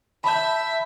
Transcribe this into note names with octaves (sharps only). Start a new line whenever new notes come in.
E5 A5 B5 G6